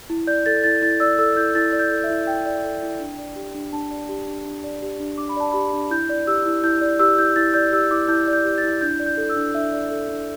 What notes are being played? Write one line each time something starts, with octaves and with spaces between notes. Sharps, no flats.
E4
D5 G6
A4 A6
E4 A6
E4 A6
D5 E6
A4 E6
E4 G6
E4 A6
D5
G6
A4
E5
E4
E4 G5
D5
A4
E4
D4
D5
G4
D4
D4 A5
D5
G4
D4
D4
D5
G4
D4
D4 D6
B5
D5 A5
G4 B5
D4
E4 G6
D5
G4 E6
E4
E4 G6
D5
G4 E6
E4 G6
E4 A6
D5 G6
G4 E6
E4 D6
E4 G6
D5
G6
G4
A6
E4
D4 G6
D5
G6
A4
E6
D4
D4 E5
D5
A4
D4